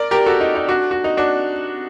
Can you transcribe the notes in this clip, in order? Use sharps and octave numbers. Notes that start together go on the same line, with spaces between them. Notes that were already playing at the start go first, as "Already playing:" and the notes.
Already playing: A#4 D5
G4 A#4
F#4 A4
D#4
D#4
D4 F#4
F#4
D#4
D4 F#4